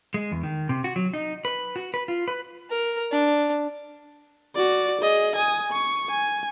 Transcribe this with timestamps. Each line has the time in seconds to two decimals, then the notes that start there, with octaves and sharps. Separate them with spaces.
0.14 G#3
0.32 E2
0.43 D#3
0.69 C3
0.84 F#4
0.96 F#3
1.14 D#4
1.45 B4
1.76 F#4
1.94 B4
2.08 F4
2.28 B4
2.70 A#4
3.12 D4
4.55 F#4 D5
5.01 G#4 D#5
5.36 G#5 D#6
5.72 C#6
6.10 G#5